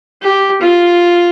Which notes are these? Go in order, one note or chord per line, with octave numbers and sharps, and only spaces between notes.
G4
F4